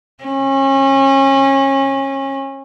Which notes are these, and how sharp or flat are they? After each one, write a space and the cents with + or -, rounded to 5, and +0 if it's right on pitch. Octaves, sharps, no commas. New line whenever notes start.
C#4 -30